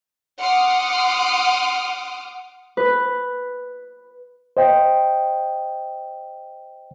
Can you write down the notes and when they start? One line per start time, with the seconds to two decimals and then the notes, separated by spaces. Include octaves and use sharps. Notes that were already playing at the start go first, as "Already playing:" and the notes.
0.38 F#5 C6 D6 D#6 F6
2.77 B4
4.57 C5 D#5 G5